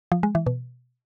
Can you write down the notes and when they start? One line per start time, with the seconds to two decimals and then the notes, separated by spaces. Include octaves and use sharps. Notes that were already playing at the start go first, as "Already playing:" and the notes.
0.12 F3
0.23 G#3
0.35 E3
0.46 B2